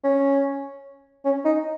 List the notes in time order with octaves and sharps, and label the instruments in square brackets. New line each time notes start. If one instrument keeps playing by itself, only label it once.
[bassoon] C#4
C#4
D#4